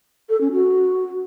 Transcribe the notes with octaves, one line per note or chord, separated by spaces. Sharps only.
A4
C#4
F#4